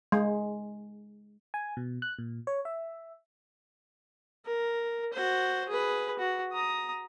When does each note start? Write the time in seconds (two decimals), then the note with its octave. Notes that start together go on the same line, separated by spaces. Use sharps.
0.12 G#3
1.54 G#5
1.77 B2
2.02 F#6
2.19 A#2
2.47 C#5
2.65 E5
4.46 A#4
5.14 F#4 C5
5.69 G#4 B4
6.19 F#4
6.53 A#5 D#6